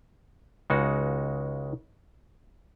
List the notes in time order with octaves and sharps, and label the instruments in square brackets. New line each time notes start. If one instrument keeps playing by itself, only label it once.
[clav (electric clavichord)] C#2 C#3 G#3 D#4 F#4